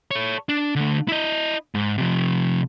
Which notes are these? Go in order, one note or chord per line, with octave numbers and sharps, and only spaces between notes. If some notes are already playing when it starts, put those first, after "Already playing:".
A4 C#5
D4
D3 A3
E4 D#5
G#2
C3 F3